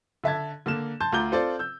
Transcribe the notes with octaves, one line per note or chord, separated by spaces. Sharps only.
D3 E5 A5 G#6
D3 A#3 F6 E7
A5 C6 G6
D2 F4 A#5 D6 G6 G7
C4 F4 A4 C5 D5
E6 G6